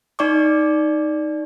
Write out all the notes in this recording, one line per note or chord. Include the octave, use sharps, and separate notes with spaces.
D#4 D5 C#6 D6